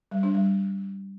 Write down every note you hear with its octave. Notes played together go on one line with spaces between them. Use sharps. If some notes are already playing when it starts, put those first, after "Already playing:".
G3
D4
G3